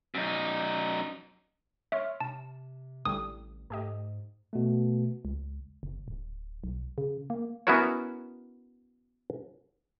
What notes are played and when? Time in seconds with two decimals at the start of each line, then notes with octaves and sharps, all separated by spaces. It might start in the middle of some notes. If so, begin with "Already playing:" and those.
0.14 F#2 D#4
1.92 C#5 E5 C6 F6
2.21 C3 A5
3.05 A1 A2 D3 G3 D#6
3.70 G#2 A3 G4 D#5
4.53 B2 A3
5.25 C#2
5.83 F#1
6.08 D1
6.64 B1
6.98 C#3
7.30 A#3
7.67 B3 C#4 E4 F#4 A#4 C#5